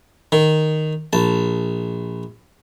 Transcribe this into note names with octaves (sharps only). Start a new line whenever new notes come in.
D#3
A#1 A5